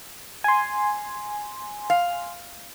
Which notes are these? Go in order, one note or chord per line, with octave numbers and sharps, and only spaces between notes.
G#5 C6
F5